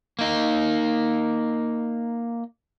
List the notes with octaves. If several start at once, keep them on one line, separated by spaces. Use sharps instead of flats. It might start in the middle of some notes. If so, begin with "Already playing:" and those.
A#3 D#4